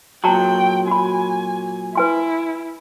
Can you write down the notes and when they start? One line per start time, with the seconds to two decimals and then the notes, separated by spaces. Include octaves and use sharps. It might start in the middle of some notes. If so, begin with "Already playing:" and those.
0.24 A#2 F#3 G5 A5 A#5
0.87 F#4 G#5 B5
1.95 E4 B4 G#5 C6